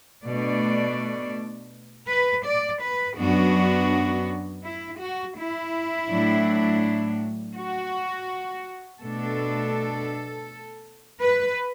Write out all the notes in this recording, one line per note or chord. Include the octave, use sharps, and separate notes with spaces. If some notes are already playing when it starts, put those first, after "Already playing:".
B2 A3 D4 D5
B4
D5
B4
F#2 F#3 B3 D4 F#4
E4
F#4
E4
A2 F#3 D4
F#4
B2 A3 D4 A4
B4